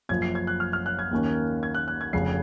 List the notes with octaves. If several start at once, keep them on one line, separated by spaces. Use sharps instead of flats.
F#1 F#2 F3 G#6
C7
G#6
F#6
F6
F6
F#6
G#6
D#2 D#3 A#3 C#4
G#6
F#6
F#6
G#6
F1 F2 C#3 C7